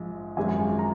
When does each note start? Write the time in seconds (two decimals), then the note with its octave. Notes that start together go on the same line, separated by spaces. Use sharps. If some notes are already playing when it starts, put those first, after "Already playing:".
Already playing: A#1 G#2 F3
0.37 G#1 F#2 F3 G#3 G#5
0.79 A#5